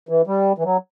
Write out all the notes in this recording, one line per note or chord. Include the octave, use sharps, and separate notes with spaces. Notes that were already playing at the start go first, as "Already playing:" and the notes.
E3
G3
E3
F#3